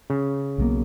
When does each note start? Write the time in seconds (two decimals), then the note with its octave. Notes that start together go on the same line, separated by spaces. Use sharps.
0.10 C#3
0.58 B1 B2 A#3